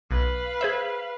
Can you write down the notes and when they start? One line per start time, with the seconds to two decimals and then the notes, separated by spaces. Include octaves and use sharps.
0.11 B1 B4 F5
0.61 G#4 C5 E5